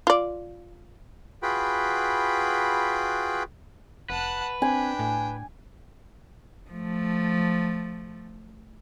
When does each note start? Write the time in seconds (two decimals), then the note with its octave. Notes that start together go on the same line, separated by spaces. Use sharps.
0.07 F4 D5
1.43 F4 F#4 G#4 B4 G5 B5
4.10 F1 B4 F#5 A5
4.62 C4 D4 G5 G#5
4.99 A2
6.70 F3 A3